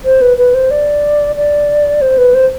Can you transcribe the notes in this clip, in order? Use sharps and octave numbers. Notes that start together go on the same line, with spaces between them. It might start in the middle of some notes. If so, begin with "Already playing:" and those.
C5
B4
B4
C5
D5
D5
C5
B4
C5